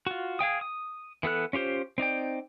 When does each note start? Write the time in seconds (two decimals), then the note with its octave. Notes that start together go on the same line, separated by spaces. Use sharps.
0.07 F4 F#4
0.39 G#4 F5 G5 D#6
0.61 D#6
1.23 E3 B3 A4 F#6
1.53 C#4 F4 G4 C5
1.98 C4 D#4 D5 G5